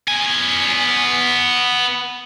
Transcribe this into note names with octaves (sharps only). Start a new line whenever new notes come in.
B3 G#5